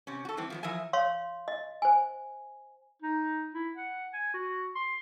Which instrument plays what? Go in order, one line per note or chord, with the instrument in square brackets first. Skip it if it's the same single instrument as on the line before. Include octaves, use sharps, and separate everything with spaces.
[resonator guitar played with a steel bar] C3 C#4
F#4 A4
E3 G3 C4
F3 G#3 B3
E3 F3 A#4 E5 G#5
[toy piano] C#5 F5 C6
D#5
C5 G#5
[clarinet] D#4
E4
F#5
G#5
F#4
C6